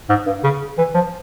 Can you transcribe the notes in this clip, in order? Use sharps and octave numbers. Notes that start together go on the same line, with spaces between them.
G#2
G2
C#3
E3
F3